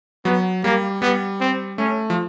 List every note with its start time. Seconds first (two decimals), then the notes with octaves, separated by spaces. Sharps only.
0.25 F#3 B3
0.64 G3 A#3
1.02 G3 B3
1.40 C4
1.78 A3 C#4
2.10 F3